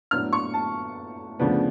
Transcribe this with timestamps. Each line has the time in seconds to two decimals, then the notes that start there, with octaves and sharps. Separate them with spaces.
0.11 A2 F#3 B3 D4 F6
0.33 C#6
0.54 A5
1.39 D2 C#3 F3 B3 D4